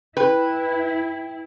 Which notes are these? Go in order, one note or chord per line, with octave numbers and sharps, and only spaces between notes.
E4 B4 G5